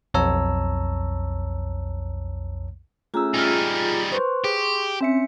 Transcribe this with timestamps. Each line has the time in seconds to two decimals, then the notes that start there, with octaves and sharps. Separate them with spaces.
0.14 B1 F2 C#5 A5 A#5 E6
3.14 A3 C#4 F4 G#4 A#5 E6
3.34 G3 D#4 G#5 F6
4.12 B4 C5 C6 C#6
4.44 G4 G#4
5.01 C4 C#4 E5 C#7